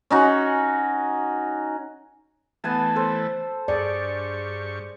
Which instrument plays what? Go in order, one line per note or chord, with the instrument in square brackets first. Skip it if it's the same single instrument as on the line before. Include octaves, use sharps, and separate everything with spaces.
[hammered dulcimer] C#4 D#4 F#4
[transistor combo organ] E3 A3 [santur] B3 G#5 A5
[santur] A4 C5
[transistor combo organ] G2 C#6 [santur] G#4 [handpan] D5